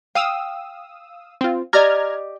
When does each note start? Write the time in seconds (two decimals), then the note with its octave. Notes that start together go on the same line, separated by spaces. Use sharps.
0.15 F5 G5 D#6 E6
1.41 C4 F4
1.73 G4 D5 D#5 A#5 F6 G#6